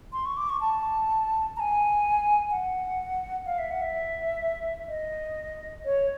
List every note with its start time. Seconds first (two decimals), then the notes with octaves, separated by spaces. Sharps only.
0.13 C6
0.26 C#6
0.37 D6
0.49 C#6
0.61 A5
1.57 A#5
1.60 G#5
2.51 F#5
3.46 F5
3.59 E5
3.71 F#5
3.82 E5
4.89 D#5
5.85 C#5